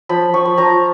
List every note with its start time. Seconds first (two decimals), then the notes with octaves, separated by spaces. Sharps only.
0.09 F3 B5
0.34 F3 C#6
0.45 B5
0.57 F3 A#5